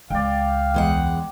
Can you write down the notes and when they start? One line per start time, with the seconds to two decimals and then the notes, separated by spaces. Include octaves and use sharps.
0.10 C#2 D5 F5 G5
0.74 E2 G#3 F#5